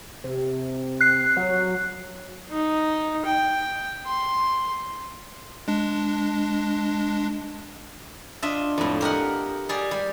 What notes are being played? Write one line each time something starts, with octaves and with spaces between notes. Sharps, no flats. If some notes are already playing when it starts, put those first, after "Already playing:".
C3
F#6 C7
F#3
D#4
G5
C6
G#3 D4
D4 F4 D#5 E5
F2 A2
G4 A#4 D#5 F#5
G3 G#4 D5
G3